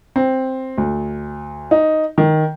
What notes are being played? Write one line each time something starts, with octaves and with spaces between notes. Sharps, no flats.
C4
D2
D#4
D#3